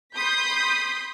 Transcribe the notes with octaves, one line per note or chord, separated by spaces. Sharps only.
B5 C6 D#6 G6 B6